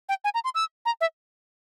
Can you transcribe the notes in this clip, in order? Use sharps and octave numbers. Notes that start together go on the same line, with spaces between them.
G5
G#5
A#5
C6
E6
A#5
E5